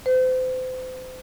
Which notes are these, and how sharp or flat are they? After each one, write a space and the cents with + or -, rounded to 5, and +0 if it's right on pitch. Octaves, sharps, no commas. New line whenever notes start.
C5 -35